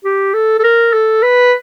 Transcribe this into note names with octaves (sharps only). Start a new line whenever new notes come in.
G4
A4
A4
A#4
A4
B4